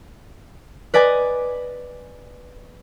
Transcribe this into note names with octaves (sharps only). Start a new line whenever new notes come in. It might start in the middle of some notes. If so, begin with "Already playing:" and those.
B4 D5 D#5 G#5